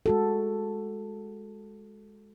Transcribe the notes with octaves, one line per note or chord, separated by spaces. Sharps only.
G#3 F#4 A4